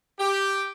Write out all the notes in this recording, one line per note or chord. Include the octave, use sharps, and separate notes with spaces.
G4